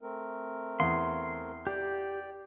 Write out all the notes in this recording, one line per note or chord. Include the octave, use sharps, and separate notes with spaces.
A3 C4 A#4
E2 C6
G4 D5 G5